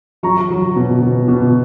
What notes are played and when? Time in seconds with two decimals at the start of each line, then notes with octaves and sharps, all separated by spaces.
0.23 F#3 A#5 C#6
0.50 F#3
0.76 B2
1.02 B2
1.28 B2